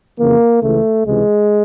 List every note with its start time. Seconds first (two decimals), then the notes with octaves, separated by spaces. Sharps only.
0.20 F2 C#3 E3 A#3
0.63 C#2 C#3 E3 A3
1.06 C#2 C3 E3 G#3